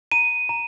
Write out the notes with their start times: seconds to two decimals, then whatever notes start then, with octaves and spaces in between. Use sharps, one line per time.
0.12 A#5 D#7
0.49 A#5